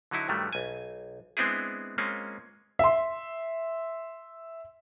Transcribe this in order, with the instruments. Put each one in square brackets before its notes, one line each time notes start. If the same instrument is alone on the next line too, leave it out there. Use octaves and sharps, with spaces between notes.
[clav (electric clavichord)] D3 F#3 D#4 E4
G2 D#3 F#3 G3 A3
B1 G#5
G#3 B3 C4 D4 E4 G#4
G#3 A#3 C4 C#4 F4
[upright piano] E5 C6